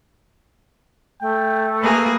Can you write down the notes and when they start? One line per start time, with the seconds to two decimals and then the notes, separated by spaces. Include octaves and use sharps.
1.21 A3 G5
1.82 A#3 G#4 B4